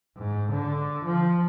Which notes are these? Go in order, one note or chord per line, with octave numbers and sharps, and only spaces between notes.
G#2
D3
F3